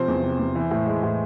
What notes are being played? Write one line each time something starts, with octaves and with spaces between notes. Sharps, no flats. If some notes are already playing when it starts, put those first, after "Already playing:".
Already playing: C3 F3 C5
E2
C3
E2
E3
A2
G#3
A2